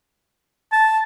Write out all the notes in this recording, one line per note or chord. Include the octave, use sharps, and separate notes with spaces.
A5